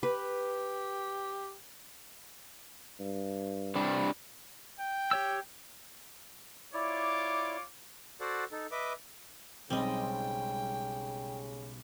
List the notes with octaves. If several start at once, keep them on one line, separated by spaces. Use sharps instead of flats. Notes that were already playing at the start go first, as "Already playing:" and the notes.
G4 B4
G2
C3 G3 D4
G5
G4 C#5 E6
E4 F4 C#5 D5 D6
F#4 A4 C5 D5 F#5
D#4 A4
B4 D#5 E5 D6
B1 C#3 G3 G#3 C4 D#5 G5